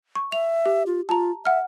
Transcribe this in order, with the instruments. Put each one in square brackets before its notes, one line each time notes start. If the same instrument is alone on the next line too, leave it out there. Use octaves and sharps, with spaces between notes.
[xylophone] C#6
[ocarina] E5 [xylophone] F7
[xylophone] G4
[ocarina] F4
[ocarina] F4 [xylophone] A5 A#5
[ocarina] E5 [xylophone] F#5 F6